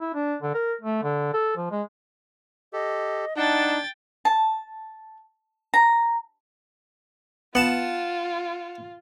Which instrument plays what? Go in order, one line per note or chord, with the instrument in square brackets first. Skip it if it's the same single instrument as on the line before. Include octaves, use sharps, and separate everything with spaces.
[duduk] E4
D4
D3
A#4
A3
D3
A4
F3
G#3
[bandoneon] G4 A4 [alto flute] D#5
[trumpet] D4 [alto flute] D#4 [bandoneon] F#5 A5 [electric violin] G5 A6
[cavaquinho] A5
A#5
[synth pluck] B3 E7 [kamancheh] F4 [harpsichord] F#5 A5